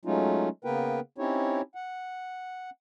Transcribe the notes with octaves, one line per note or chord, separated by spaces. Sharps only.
F#3 G#3 A3 C#4 D#4 F4
C#3 A#3 B3 A#4 B4 G5
C4 C#4 D#4 E4 G4 C#5
F#5